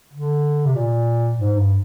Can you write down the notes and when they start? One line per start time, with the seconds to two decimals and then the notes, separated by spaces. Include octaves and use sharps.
0.14 D3
0.66 C3
0.75 A#2
1.37 G#2
1.57 G2